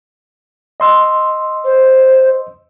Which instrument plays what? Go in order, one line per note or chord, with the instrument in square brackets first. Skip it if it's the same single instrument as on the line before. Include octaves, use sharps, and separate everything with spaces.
[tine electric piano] D#5 C6 E6
[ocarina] C5